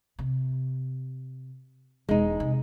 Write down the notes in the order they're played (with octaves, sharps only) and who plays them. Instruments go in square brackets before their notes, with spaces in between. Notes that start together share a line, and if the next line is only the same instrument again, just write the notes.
[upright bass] C3
[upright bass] E1 [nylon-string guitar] G#3 D#4
[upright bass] C3